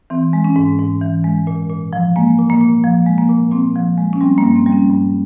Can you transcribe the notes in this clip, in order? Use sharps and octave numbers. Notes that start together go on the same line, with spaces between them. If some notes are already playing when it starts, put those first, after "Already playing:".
E3 C4
G#3
C#4
G#2
G#2
E3
G#3
A#2
A#2
F3
G#3 A#3
A#2
A#3
A#2
F3
G#3
A#3
A#2
A#2 C4
F3
G#3
C#4
G3 C4
A#3
G2
C4
G3
C#4
G2